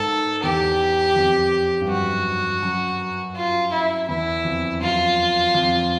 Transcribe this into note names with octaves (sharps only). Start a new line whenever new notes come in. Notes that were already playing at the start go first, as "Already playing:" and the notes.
Already playing: G#2 A4
E2 G4
F2
G2
F#2 F#4
F#2
F4
E4
E2 E4
F2
F#2 F4
F2